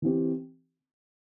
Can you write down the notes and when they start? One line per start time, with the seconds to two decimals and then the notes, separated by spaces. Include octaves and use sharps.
0.02 E3 C4 G4